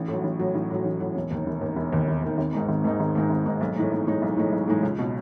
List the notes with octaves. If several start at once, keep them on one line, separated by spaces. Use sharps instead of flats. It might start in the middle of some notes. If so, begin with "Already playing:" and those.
Already playing: A1
A2
F#3
A1
A2 F#3
A1
A2 F#3
A1
A2 F#3
E1
D#2 D#3
E1
D#2 D#3
E1
D#2 D#3
E1
D#2 D#3
G#1
G#2 D#3 G#3 D#4
G#1
G#2 D#3 G#3 D#4
G#1
G#2 D#3 G#3 D#4
G#1
G#2 D#3 G#3 D#4
B1
A2 E3 G#3 D#4
B1
A2 E3 G#3 D#4
B1
A2 E3 G#3 D#4
B1
A2 E3 G#3 D#4
C#2
B2 F#3